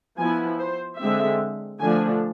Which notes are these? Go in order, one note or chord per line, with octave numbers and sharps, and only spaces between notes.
F3 B3 E4 G#5
C5
D3 G#3 C4 E5
D3 F3 A3 D4 G#5